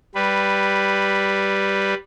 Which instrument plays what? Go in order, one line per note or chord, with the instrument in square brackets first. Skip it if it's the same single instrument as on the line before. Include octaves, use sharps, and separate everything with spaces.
[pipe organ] G3 B4